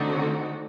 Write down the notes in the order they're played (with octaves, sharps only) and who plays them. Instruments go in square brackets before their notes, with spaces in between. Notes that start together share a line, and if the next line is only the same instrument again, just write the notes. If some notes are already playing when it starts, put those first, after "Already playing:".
Already playing: [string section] D3 A3 C4 D#4 F#4